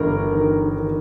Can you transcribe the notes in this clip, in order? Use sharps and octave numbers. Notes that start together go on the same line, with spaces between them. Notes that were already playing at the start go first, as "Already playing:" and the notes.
Already playing: G1 A#4
D#3
D#3